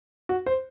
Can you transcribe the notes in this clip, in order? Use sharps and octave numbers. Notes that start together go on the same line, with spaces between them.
F#4
C5